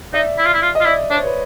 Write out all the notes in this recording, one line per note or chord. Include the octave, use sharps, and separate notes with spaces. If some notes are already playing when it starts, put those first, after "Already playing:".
D#4 D5 E5
E4
F4
E4
F4
D#5
F4
E4 D5 E5
D4 C#5
C5
B4 C#5